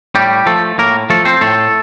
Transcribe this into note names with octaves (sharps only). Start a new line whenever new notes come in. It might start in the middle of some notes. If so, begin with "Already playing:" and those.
A2 G3 G4
F3 A3 A4
A2 A#3 A#4
F3 A3 A4
C4 C5
A2 A3 A4